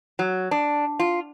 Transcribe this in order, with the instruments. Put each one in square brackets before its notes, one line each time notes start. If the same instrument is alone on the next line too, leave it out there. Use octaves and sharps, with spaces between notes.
[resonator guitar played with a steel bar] F#3
D4
F4